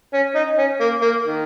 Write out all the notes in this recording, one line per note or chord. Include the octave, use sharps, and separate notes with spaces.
C#4
D#4
C#4
A#3
A#3
D#3